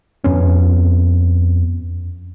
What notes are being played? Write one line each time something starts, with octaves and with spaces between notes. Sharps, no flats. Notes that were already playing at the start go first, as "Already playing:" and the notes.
F2 B3 C#4